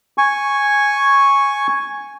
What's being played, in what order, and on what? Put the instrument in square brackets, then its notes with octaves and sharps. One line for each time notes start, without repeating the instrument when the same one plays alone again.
[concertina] G#5 C#6